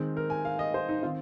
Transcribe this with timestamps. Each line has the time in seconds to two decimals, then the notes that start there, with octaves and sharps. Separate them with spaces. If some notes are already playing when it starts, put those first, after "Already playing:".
Already playing: D#3 G#3 C4
0.17 A#4
0.30 G#5
0.45 F5
0.59 D#5
0.74 C5
0.89 D#4
1.02 D#3 C4 F4